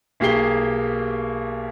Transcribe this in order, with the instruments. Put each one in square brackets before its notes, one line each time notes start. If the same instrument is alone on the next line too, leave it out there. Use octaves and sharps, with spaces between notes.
[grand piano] B1 A#3 G4 G#4 C7 G7